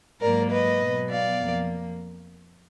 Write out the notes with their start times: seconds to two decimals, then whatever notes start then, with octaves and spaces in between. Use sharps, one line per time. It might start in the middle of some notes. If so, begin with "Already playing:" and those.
0.21 G#2 F#3 A#3 A#4 D5
0.51 B4 D#5
0.80 B2 F#3 B3
1.10 D5 F5
1.40 F2 F3 A#3